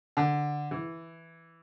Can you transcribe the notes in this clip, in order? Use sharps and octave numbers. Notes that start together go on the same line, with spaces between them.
D3
E3